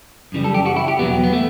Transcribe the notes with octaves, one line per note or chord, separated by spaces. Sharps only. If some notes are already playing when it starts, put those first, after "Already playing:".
F#2 C#3 E3 G3
A4
G4
F#4
E4
G4
E2 B2 F#3 B3
B3
A3